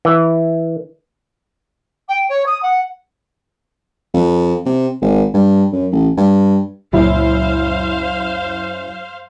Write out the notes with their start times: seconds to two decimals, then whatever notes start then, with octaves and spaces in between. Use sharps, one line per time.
0.05 E3
2.08 G5
2.29 C#5
2.46 D#6
2.62 F#5
4.14 F2
4.66 C3
5.02 G#1
5.34 G2
5.73 F#2
5.92 A1
6.17 G2
6.93 C#2 F#2 A#2 E4 C5 F5